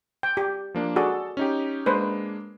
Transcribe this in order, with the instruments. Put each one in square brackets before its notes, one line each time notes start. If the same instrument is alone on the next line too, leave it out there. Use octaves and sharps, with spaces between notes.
[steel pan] G5
G4
[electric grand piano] F3 A#3 D4
[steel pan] F#4 G#4 D5 [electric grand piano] A4
[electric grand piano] C#4 D#4 G4
[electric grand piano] G#3 A#3 D4 [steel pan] B4 C5